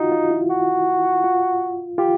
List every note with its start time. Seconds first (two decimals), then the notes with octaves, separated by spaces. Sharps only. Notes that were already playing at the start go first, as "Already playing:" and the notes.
Already playing: D#4 F4 F#4
0.12 F4
0.30 E4
0.50 F#4
1.24 F4
1.98 F4 G4